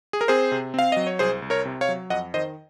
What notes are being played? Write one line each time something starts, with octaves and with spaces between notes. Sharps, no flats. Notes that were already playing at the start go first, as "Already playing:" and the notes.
G#4
A#4
C4 G#4 C5
C3
C4 F5
F#3 D#5
C#5
C2 G#4 C5
C2
A#4 C#5
C3
C#5 F5
F#3
F2 D#5 F#5
D#3 C5 D#5